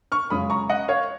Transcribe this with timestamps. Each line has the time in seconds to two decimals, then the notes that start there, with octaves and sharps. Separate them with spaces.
0.12 C#6 F6
0.30 F#2 C#3 G#3 C#4 F4 B5 D#6
0.50 A#5 C#6
0.69 D#5 F#5
0.88 C#5 F5